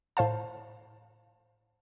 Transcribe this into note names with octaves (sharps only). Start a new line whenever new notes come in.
A2 C5 F5 A5